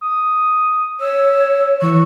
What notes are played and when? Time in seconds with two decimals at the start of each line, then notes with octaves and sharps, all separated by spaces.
0.01 D#6
1.00 C#5 E6
1.82 E3 C#6